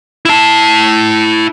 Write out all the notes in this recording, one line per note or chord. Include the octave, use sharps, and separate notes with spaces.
E4 A5